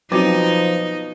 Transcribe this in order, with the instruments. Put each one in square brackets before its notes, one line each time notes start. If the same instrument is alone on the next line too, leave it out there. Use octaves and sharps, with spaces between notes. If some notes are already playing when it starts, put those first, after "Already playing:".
[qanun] B2 F5 A5 [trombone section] F3 [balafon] F#3 C4 F#4 [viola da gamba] D#4